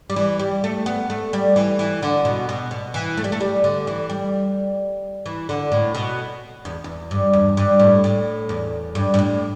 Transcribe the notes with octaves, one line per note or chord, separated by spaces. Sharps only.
G3
E3
G3
A3
B3
A3
G3
E3
E3
D3
B2
B2
B2
E3
A3
G3
A3
G3
D3
E3
G3
E3
D3
A2
B2
E2
E2
G2
E2
G2
A2
A2
E2
G2
G2
A2